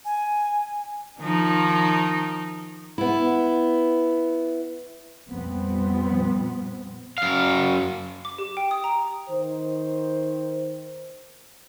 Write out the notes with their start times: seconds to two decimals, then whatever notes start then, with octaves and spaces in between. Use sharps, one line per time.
0.05 G#5
1.19 D#3 F3 D#4
2.98 B3 E4
5.30 F2 A#2 G3 B3 C4
7.18 F#2 F5
8.25 D6
8.38 G4
8.57 G5
8.71 D#6
8.84 A#5
9.30 D#3 C5